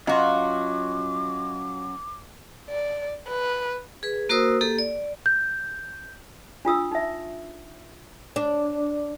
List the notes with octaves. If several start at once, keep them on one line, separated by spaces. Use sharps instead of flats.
F#3 C#4 F4 F#4 D#5 A#5 C6 D6
D5
B4
G#4 B4
A#3 F#4 A#4 C5 D#6 E6
A#3 G4 A4
D5
G6
D4 F4 D#6 E6
D#4 E5
D4